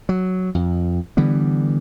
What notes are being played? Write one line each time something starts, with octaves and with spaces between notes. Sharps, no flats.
F#3
F2
D3 E3 G3 B3